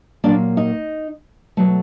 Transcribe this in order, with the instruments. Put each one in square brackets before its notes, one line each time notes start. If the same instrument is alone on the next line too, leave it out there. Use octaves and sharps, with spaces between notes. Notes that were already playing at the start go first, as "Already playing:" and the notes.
[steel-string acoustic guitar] A#2 F#3 A#3 D4 D5
D#4 D#5
B2 F#3 A3